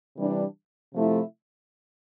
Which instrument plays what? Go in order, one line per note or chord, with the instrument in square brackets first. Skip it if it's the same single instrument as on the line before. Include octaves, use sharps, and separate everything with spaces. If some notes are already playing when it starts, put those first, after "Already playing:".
[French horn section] C3 E3 G3 D4
C3 F3 A3 E4